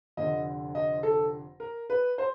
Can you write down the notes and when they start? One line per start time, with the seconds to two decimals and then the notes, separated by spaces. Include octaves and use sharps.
0.17 F1 F2 D3 D#5
0.75 D#5
1.03 A4
1.60 A#4
1.90 B4
2.18 C5